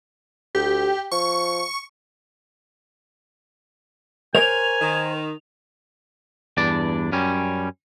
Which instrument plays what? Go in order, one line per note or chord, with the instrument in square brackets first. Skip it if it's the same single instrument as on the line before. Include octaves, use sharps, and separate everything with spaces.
[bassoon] D2 [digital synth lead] G4
[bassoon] F3 [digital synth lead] C#6
[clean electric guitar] A#4 C5 C#5 [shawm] G#5 [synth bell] F7
[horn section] D#3
[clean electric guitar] E2 G2 D4 D5
F#2 G3 C#4